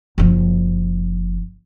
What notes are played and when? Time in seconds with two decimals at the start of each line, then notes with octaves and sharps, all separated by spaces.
0.18 F#1 F3